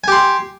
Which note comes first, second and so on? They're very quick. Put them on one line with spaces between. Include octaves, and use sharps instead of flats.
G#5 G4 C6